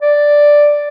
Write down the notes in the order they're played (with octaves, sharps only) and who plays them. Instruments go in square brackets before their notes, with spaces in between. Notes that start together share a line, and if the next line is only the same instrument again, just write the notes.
[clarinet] D5